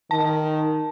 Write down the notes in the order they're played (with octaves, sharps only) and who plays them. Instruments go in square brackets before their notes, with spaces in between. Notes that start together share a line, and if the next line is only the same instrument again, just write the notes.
[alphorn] D#3 [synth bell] A5